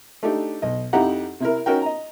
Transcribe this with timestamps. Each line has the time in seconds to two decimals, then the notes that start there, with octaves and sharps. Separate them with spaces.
0.23 A3 D4 D#4 G4
0.62 B1 D#5
0.93 F2 D#4 E4 G4 F#5 A#5
1.40 C3 E4 A#4
1.66 C#4 D#4 F#4 A#4 G5
1.82 D#5 A#5